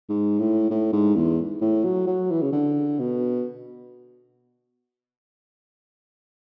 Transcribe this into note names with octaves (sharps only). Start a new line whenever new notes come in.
G#2
A2
A2
G#2
E2
A2
F#3
F#3
E3
C#3
D3
B2